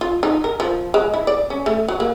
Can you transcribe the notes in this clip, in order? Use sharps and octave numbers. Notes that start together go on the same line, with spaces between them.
F4
D#4
A#4
F3
G#3
E4
D5
C#4
A3
F#3
A#3